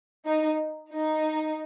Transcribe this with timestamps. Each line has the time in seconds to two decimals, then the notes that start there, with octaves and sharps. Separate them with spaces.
0.26 D#4
0.93 D#4